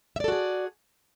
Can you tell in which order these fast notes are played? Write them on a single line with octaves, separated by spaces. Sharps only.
E5 D5 A4 F#4 G#4